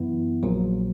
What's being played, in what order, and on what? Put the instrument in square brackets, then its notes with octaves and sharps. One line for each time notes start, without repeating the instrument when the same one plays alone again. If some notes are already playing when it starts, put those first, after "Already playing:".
Already playing: [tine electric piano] F#2 E3 B3 E4
A#1 A#2 F#3